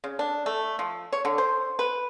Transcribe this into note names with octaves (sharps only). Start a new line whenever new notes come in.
C#3
D4
A3
F3
C#5
D3
C5
B4